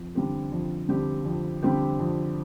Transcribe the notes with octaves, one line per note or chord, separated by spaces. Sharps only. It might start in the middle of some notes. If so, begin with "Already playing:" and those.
Already playing: F2
D3 G3 C4 G4
F2
D3 G3 C4 G4
F2
D3 G3 C4 G4
F2